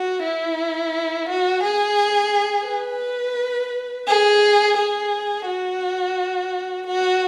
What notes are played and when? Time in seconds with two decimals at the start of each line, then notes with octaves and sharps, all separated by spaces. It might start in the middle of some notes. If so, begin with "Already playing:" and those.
Already playing: F#4
0.23 E4
1.29 F#4
1.63 G#4
2.68 B4
4.08 G#4
4.78 G#4
5.46 F#4
6.87 F#4